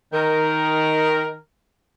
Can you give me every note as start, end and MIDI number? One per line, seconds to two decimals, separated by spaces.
0.13 1.36 51
0.13 1.36 70